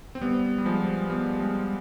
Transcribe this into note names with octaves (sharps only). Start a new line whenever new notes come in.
C4
G3 B3
G3
F3 G#3
G3 B3
G#3 C4